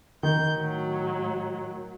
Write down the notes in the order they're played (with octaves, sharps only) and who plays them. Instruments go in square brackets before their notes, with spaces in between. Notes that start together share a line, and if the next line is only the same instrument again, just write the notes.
[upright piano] D#3 [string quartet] G6
[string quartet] A2 F#3